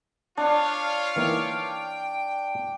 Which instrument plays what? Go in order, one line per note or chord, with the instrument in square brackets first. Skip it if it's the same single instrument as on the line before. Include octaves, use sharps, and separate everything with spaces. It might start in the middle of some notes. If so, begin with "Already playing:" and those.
[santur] D4 [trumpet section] F4 C#5 F5
[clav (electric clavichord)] E3 A#3 D#4 [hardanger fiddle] G5